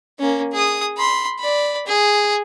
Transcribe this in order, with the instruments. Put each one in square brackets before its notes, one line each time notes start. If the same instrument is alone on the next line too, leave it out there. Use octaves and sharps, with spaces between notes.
[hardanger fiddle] A#3 C#4
G#4 D#6
B5 C6
D5 B5
G#4